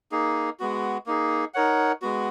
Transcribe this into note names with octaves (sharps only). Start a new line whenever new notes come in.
A#3 D#4 G#4
G#3 B3 F#4
A#3 D#4 G#4
D#4 A#4 C#5 F#5
G#3 B3 F#4